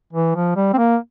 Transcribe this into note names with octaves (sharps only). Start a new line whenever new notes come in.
E3
F3
G3
C4
A#3